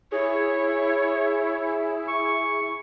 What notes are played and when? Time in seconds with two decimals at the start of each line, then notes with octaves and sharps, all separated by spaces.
0.12 E4 G#4 C#5
2.08 C#6